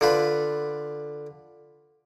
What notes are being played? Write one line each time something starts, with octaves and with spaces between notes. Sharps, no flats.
D3 F4 B4